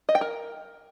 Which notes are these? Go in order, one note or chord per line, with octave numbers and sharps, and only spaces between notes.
D#5
G5
A#4